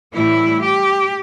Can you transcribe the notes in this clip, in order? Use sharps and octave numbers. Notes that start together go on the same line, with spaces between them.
A2 E3 G3 E4
G4